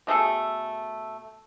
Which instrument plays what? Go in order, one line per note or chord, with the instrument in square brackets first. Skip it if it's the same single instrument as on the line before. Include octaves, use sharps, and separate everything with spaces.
[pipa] B2 A3 G#4 A4